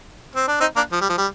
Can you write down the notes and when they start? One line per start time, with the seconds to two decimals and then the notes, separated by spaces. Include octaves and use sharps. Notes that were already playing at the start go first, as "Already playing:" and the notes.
0.35 C4
0.48 D4
0.60 C4 D#4
0.76 A#3 D4
0.92 F3
1.01 G3
1.09 F3
1.18 G3